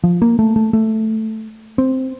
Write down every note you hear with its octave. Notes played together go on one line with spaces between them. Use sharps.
F3
A#3
A3
A3
A3
C4